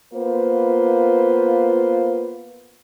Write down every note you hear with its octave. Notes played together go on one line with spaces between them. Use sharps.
A#3 B3 F4 B4 C5